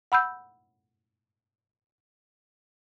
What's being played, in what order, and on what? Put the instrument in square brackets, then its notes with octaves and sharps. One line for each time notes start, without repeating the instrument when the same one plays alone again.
[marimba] F#5 B5 E6 G6